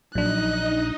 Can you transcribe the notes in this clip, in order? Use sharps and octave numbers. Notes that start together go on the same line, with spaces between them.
A#1 F#3 D4 D#4 D#5 F#6